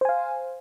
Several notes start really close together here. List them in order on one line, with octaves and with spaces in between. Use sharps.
C5 G#5 F5